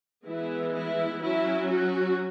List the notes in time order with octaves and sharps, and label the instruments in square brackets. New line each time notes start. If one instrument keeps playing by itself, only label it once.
[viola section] E3 G#3 B3 E4
E4
F#3 C#4 E4
F#4